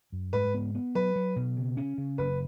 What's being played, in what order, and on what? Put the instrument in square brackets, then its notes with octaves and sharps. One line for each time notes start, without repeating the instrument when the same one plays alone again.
[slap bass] F#2
[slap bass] G#2 [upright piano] B4
[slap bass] B3
B3
[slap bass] F#3 [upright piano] B4
[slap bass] F#3
B2
C#3
C#4
C#3
[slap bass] F#1 [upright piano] B4